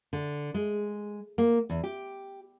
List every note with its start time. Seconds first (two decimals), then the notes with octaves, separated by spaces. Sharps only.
0.13 D3
0.54 G#3
1.38 A#3
1.70 E2
1.84 G4